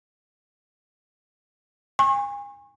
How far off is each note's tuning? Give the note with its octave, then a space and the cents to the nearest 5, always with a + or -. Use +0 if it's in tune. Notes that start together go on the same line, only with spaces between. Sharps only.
G#5 -35 C#6 -30